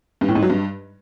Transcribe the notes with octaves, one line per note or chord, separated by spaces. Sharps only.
G2
A2
G#2
F#3
G2